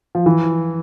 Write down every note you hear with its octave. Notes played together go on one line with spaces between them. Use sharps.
F3
E3